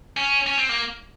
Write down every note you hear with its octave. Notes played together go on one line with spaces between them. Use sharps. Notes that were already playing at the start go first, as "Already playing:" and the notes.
C#4
C#4
C4
A#3